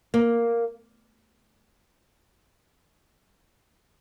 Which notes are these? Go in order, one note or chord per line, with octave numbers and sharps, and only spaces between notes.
A#3